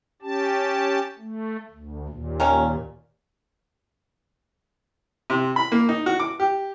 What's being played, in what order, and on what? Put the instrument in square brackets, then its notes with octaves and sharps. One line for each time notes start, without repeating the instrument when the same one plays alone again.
[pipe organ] C#4 G4 A5
A3
D2
D#2 A#2
[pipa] D#3 A#3 C#4
[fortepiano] C3
B5
A#3
D#4
F#4
D6
G4